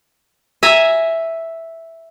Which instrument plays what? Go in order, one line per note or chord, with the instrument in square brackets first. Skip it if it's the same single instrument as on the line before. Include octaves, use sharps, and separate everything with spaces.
[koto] E5 G#5 A#5